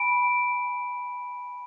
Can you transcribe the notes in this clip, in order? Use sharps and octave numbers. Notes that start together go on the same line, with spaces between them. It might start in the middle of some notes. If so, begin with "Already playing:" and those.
Already playing: G#5 B5 D7